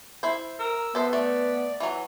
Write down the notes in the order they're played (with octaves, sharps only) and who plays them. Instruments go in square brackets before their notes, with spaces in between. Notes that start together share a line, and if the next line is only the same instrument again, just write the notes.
[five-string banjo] E4 C5
[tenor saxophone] A#4 [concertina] E6
[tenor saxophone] B3 [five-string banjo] A4 C5 E5
[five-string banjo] A3 [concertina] D5
[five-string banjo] E3 F#3